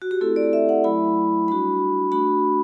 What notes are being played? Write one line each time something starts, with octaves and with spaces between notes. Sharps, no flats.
F#4
G4
A3 C4 E4 A4
D5
E5
F#5
F#3 A3 E4 B5
G3 D4 F#4 B5
A3 D4 F#4 B5